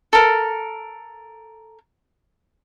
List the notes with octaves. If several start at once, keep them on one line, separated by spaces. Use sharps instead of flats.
A4 A#4